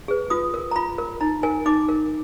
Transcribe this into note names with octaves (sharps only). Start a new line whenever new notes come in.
G#4 B4
F4 D#6
A#4
A#5
F4 B5
A#4
D#4 A#5
A#4 G#5
D#4 D6
A#4